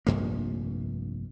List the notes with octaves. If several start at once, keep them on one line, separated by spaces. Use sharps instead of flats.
F1 A#1 G2 A#3